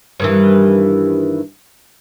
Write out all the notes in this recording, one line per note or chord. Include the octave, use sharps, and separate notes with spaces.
G2 D#3 E3